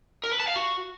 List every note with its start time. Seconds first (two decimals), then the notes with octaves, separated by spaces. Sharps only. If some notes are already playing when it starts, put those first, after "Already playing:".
0.24 A#4
0.32 B4
0.40 A5
0.48 F5
0.56 F#4